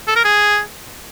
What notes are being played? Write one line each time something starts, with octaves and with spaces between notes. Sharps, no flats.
A4
A#4
G#4